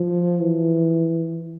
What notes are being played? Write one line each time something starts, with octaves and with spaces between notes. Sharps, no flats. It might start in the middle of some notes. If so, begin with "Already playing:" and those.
Already playing: F3
E3